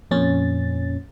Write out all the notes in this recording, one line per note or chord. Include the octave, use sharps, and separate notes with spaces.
F2 A#2 C#4 A6